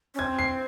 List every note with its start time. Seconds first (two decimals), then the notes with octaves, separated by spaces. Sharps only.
0.14 C#4
0.19 C4 G#6
0.39 C7